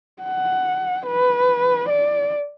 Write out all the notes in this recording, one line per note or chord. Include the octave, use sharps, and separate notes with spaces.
F#5
B4
D5